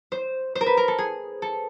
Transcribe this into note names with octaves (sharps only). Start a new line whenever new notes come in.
C5
C5
A#4
B4
A#4
A4
G#4
A4